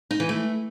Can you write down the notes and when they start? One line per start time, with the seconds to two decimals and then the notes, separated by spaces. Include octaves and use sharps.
0.11 D#4
0.20 E3
0.29 A3